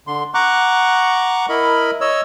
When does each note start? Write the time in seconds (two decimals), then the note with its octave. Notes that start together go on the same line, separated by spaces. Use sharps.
0.07 D3 C6
0.34 F#5 A#5 C#6 D6 F#6
1.49 E4 A#4 D#5 B5
2.01 C#5 D#5 E6